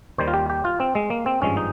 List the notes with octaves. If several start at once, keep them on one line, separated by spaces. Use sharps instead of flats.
D#2 D#3 G3 C5
F4
G4
G4
F4
C4
G#3
A#3
C4
G#1 G2 F3 G#3 C#4
D#4